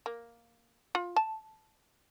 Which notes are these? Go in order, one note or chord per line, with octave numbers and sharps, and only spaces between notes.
A#3
F4
A5